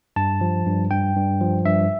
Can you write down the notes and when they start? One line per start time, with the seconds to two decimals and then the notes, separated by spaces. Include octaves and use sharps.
0.16 G2 A5
0.41 F3
0.66 G2
0.91 G2 G5
1.16 G2
1.41 F3
1.65 G2 E5